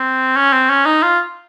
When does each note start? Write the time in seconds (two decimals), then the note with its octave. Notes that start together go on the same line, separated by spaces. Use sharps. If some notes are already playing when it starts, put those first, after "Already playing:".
Already playing: C4
0.36 C#4
0.53 C4
0.69 C#4
0.86 D#4
1.02 F4